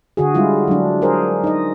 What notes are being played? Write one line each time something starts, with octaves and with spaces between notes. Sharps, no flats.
D3 F#4 G#4
G3 G#3 E4 F4
F#3 D4
G#4 A#4 C5
D#4 D#5